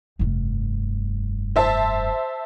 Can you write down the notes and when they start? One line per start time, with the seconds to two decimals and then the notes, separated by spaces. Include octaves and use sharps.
0.19 F1 G2
1.56 C5 E5 A5